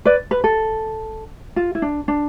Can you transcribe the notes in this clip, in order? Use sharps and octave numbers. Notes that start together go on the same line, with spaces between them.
B4 D5
B4
A4
F4
E4
D4
D4